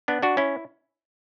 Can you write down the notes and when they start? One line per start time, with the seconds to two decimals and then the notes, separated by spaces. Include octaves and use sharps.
0.08 B3 D4
0.22 D4 F#4
0.37 C#4 E4